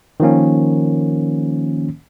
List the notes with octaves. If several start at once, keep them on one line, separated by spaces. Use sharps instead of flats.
D#3 F3 A#3 C#4